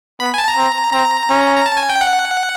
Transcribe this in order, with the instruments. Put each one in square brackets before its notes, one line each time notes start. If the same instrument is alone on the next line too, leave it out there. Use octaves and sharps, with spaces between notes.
[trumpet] B3 [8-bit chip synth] B5
[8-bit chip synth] G#5
A5
A#5
[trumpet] C4
[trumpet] C4 [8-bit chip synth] A#5
[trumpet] C#4
[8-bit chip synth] A#5
A5
G#5
G5
F#5